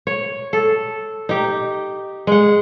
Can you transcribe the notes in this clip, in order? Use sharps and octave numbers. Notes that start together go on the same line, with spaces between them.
C#5
A4
D#4 G4
G#3 F#5